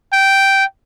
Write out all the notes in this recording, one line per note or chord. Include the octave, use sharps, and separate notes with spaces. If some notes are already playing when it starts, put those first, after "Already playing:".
G5